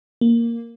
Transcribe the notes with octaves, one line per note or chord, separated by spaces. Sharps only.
A#3